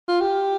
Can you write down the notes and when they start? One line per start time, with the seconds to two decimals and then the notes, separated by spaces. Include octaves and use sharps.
0.08 F4
0.21 G4